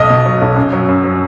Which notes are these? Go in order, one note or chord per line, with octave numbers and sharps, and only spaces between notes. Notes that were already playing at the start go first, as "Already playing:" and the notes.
Already playing: B1 D#5
B2
F#3
B1
F#2
F#3
F#2
F#3